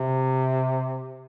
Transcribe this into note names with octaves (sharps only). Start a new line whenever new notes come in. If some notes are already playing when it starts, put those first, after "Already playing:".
Already playing: C3